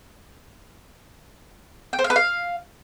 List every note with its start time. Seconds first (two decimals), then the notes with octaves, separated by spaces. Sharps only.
1.93 G5
1.99 C5
2.04 F5
2.10 B4
2.16 F5